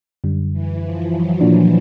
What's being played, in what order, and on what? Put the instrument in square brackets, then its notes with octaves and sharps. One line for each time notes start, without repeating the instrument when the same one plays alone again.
[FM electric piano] F#2 D3 G3
[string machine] E3
F3
F#3
[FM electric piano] A#2 F3 A#3 D4